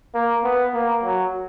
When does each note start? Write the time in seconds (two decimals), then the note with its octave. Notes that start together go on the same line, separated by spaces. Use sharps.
0.14 A#3
0.44 B3
0.74 A#3
1.03 F#3